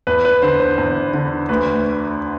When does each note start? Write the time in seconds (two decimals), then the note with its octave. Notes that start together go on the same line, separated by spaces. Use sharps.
0.07 E2 B4
0.25 B4
0.42 D3 C5
0.60 C5
0.78 E2
1.14 D3
1.49 D2 B4